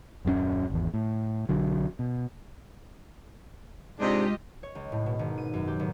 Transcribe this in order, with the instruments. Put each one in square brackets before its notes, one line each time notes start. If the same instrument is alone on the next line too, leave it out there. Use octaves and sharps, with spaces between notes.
[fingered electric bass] D#1 F#2 G#3 C#4
G#1 E2
A2
B1 D3 F#3
B2
[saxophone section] G#2 C3 D4 [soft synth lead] G#3 [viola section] F4 G4 D#5
[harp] C#5
C#2
A2
B2
G#1
D#7
F#2
G4
G#1